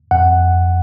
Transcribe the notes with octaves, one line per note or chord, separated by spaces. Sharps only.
F2 F#5